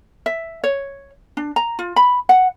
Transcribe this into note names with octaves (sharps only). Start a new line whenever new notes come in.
E5
C#5
D4
A#5
F4
B5
F#5